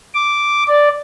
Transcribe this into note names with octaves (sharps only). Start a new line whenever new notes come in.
D6
D5